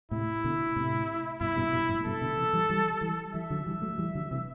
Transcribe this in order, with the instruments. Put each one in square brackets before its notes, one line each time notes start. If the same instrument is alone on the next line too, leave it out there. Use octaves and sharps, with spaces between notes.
[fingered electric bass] A2 C3 [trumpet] E4
[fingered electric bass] B2 D3
A2 C3
[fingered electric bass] G2 B2 [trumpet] E4
[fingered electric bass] G2 B2
G2 B2
F#2 A2
[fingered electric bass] G2 B2 [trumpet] A4
[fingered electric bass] B2 D3
C3 E3
E3 G3
E3 G3
E3 G3
[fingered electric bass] E3 G3 [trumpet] E5
[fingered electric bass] D3 F#3
E3 G3
F#3 A3
E3 G3
D3 F#3
C3 E3